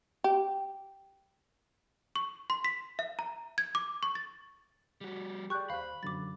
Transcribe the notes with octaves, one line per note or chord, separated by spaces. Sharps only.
G4
C#6
C6
B6
E5
A#5
G#6
D6
C#6
A6
G3 F#4
G4 G#4 D5 C#6 F#6 G6
D#2 C5 F5 B5 F#6
F#2 D3 F#3 D6 A6